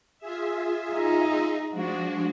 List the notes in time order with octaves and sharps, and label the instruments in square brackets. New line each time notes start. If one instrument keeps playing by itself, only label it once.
[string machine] F4 G#4 E5
[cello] D#4
[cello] F3 F#4 [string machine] G#3 D4